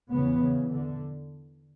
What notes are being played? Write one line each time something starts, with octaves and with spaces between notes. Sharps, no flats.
E2 C#3 B3
C#3
D3